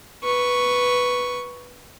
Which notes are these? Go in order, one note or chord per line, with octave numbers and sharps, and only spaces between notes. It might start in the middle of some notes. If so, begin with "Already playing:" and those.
B4 C#6